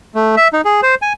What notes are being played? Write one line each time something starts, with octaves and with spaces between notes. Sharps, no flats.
A3
E5
D#4
G#4
C5
G#5